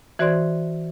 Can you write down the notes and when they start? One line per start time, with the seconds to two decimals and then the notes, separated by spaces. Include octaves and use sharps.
0.19 E3 F#4 C5 D5 C6 G#6